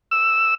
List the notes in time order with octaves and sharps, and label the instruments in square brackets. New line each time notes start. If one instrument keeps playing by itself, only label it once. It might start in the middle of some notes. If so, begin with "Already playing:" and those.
[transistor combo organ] E6